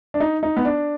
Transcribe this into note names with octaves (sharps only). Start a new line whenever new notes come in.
D4
D#4
D#4
B3
D4